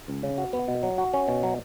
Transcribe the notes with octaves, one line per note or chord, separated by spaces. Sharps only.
C#2
C#3
F#4
B3
B2
F#3
F#4
C#4
B2
F#3